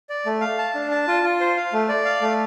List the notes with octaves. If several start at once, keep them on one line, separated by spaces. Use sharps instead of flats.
D5
A3
F5
A5
D4
A5
F4
F4
C5
F5
A3
D5
F5
A3